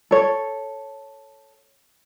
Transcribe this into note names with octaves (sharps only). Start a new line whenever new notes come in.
A4 C#5